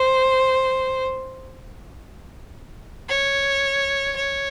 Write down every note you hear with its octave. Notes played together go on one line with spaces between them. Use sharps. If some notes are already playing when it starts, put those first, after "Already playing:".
Already playing: C5
C#5
C#5